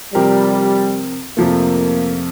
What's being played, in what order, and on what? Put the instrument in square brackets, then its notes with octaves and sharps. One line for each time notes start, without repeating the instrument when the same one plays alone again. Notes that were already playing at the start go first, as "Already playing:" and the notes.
[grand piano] C3 F3 C4 G4 A#4 [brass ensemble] G3
[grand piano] F2 C3 F3 A3 [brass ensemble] A#3